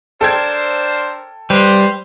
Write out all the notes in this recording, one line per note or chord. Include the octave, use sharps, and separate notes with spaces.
D4 A4 A#4 C5 G5 G#6
G3 B4 C5